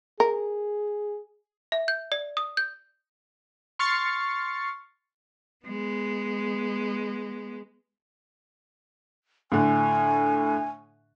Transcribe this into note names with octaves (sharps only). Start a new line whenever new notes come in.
G#4 A#4
E5
G6
D5
D#6
G6
C6 C#6 F6 A6 C7 C#7
G#3 B3
A2 D3 G#5